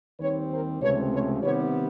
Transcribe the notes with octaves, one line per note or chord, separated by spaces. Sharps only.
D#2 D#3 G3 C4 B4 C#5
A#4 C5
C#2 C3 F3 A3 C4 B4 C#5
B4 C#5
C3 D#3 G3 B3 B4 C#5